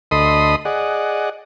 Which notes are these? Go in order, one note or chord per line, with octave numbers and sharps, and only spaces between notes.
D2 A4 D#5 B5 C6 D#6
G#4 D5 D#5 F#5